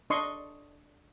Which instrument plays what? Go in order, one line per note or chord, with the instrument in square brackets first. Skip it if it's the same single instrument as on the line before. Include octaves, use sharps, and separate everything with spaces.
[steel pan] D4 D#5 C6 C#6